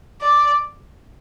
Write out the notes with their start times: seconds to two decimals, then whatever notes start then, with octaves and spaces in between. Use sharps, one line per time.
0.22 D5